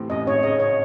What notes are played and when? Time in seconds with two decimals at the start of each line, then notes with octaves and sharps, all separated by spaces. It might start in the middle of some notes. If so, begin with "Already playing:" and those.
Already playing: A2 C3 E3 C4
0.10 A1 D#5
0.27 G#1 C#5
0.43 C#3 D#5
0.60 C#5